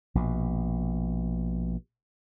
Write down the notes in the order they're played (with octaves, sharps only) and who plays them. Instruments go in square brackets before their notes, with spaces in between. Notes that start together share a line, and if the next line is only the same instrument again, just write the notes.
[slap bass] A#1 B2